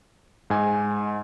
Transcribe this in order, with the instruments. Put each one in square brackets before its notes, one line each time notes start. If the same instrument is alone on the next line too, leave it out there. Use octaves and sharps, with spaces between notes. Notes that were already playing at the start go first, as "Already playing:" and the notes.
[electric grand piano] G#2 G#5